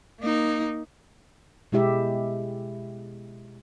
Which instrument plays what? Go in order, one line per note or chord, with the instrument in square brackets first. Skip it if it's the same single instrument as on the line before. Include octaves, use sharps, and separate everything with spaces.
[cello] A#3 D#4
[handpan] B2 G#3 E4 G4 E5